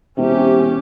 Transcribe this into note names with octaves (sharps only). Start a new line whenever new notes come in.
E1 C3 C#4 G4